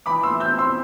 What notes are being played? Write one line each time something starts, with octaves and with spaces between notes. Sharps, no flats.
E3 B5 D6
C6 E6
A3
E6 G6
C4
C6 E6